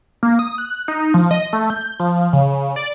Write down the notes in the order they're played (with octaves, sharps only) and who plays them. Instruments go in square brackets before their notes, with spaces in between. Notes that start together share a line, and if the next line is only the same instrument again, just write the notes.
[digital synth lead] A#3
D#6
F#6
D#4
F3
D#5
A3
G6
F3
C#3
D5